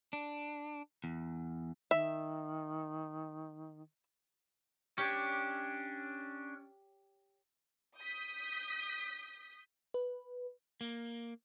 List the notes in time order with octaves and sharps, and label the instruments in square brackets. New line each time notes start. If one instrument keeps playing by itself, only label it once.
[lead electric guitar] D4
E2
[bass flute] D#3 [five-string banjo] E5
[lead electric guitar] C#4 D4 [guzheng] G4 C#5
[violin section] D#6 G6 B6
[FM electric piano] B4
[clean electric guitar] A#3